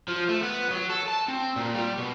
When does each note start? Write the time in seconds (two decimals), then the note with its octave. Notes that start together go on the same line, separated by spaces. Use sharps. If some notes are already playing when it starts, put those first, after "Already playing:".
0.08 F3
0.29 A3
0.43 B3
0.70 F#3
0.90 A4
1.08 A5
1.28 C4
1.56 A#2
1.74 G3
1.98 B2